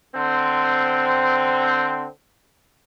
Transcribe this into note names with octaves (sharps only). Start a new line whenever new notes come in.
D3 C4